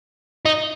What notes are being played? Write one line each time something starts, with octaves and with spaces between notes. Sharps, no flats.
D#4